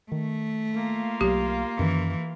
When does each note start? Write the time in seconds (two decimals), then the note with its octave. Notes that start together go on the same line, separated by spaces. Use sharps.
0.12 D#3 A3
0.74 A#3 F4
1.21 B1 F#3 G4
1.79 F#2 D#3 E3